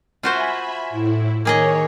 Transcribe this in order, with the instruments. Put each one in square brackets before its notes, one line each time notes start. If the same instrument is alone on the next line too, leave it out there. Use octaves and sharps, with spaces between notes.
[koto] F4 F#4 C5 [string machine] E5 G#5 B5
[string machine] A2 E4
[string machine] D#3 C#5 [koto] A#3 G#4 D#5